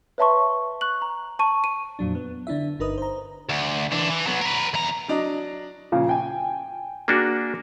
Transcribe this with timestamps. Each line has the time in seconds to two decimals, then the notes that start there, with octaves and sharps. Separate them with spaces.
0.18 B4 C#5 E5 A5 C6 C#6
0.81 C#6 F#6 F#7
1.02 A#5
1.39 A5 C#6 D#7
1.64 D#7
1.99 F2 A#2 F#3 D4
2.15 B3
2.47 D3 D4 E4 E5
2.80 G1 D#4 A#4 B4 D#6
2.98 C5 A#5
3.49 D2
3.92 E3 D4
4.10 E3
4.27 F#3 B3
4.42 A#4 B4
4.74 E2 A#5
5.08 F#3 D4 D#5
5.92 A#2 C#3 F3
6.09 G5 G#5
7.08 A#3 D4 F#4 G#4